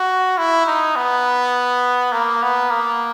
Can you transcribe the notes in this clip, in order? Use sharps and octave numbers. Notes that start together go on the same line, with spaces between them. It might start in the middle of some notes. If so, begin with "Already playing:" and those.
Already playing: F#4
E4
D#4
B3
A#3
B3
A#3